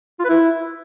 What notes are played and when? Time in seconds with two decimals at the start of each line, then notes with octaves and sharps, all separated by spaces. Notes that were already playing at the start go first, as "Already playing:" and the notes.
0.19 F4
0.24 B4
0.29 E4